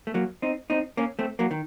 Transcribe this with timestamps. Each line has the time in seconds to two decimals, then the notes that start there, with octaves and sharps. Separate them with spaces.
0.07 A3
0.14 F#3 A#3
0.42 C4 D#4
0.70 C4 D#4
0.97 A#3 C#4
1.19 A3 C4
1.39 F#3 A#3
1.51 D#3